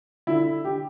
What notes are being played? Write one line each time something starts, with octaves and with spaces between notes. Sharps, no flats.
D3 E4
G4